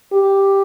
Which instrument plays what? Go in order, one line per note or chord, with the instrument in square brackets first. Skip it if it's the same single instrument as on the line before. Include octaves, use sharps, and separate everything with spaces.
[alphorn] G4